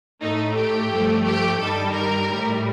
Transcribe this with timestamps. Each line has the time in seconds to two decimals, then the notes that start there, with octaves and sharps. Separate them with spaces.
0.23 A2 A3 D#4
0.58 G4
0.92 G2 F3 A3
1.26 G4
1.61 G2 D#3 G3 A4
1.95 A#4
2.29 A2 G3